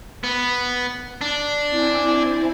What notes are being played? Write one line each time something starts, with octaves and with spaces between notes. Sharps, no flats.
B3
D4
C4 E4 G#5